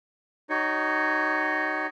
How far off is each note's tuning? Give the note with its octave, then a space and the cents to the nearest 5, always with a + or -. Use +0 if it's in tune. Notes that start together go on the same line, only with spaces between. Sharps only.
D#4 -10 F#4 +40 C#5 +0